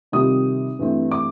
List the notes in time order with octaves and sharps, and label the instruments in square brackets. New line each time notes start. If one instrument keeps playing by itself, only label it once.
[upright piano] C3 D#3 G3 C4 F4 D#6
G2 E3 A3 C4
D6